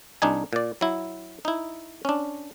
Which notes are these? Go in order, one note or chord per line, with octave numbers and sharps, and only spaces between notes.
C2 D4 D#4 G#5
A#2 D5
F#3 E4
D#4 E4
C#4 D4